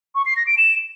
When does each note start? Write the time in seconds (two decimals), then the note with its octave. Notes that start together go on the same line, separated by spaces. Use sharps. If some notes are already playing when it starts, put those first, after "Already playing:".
0.15 C#6
0.26 C7
0.36 A#6
0.47 D7
0.58 E7